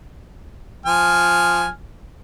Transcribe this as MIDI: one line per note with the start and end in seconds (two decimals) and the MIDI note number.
0.86 1.69 53
0.86 1.69 80
0.86 1.69 89